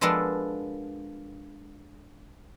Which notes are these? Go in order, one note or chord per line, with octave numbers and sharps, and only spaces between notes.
F3 G#3 B3 D4 A4 A#4